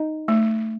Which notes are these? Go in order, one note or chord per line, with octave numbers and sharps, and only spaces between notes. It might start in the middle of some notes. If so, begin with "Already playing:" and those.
Already playing: D#4
A3